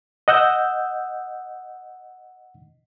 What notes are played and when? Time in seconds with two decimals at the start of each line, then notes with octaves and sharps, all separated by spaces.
0.28 D#5 F#5 E6 G6